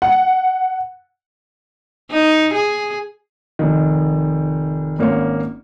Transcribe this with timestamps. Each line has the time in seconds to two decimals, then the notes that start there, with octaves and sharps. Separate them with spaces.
0.02 F#5
2.11 D#4
2.54 G#4
3.59 F1 D#3
4.99 G#1 A#3 C#4 C#5